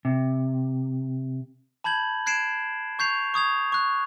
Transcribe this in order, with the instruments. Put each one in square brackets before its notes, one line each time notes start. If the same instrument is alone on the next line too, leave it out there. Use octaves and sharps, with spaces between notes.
[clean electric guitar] C3
[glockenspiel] A5 B5 G6 G#6 F#7
F#6 G#6 C7 D7 E7
C#6 G6 C7 F7
C#6 D#6 G#6 F7
C#6 F#6